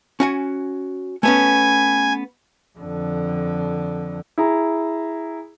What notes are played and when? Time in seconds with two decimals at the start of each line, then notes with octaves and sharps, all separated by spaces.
0.20 C#4 F#4 G#5
1.23 A3 B3 C#4 G#5
2.79 F2 D3
4.38 E4 G#4 A#5